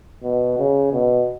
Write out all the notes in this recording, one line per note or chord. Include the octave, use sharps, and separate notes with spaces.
B2
C#3
B2